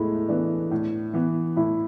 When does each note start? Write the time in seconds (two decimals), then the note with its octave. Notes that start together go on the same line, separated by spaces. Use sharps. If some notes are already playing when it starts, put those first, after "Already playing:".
Already playing: A2 G#3 A3 B3 E4
0.29 E3 B3 D4
0.71 A2
1.14 E3 B3
1.56 A2 E4